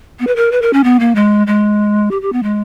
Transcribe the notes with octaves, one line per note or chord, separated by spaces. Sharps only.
B3
B4
A#4
B4
A#4
C#4
B3
A#3
G#3
G#3
G4
G4
B3
G#3